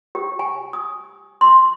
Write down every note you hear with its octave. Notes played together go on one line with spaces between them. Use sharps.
G4
G#5
D#6
C6